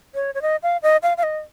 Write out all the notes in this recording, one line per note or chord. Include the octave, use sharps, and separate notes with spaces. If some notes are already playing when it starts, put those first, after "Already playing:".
C#5
C#5
D#5
F5
D#5
F5
F5
D#5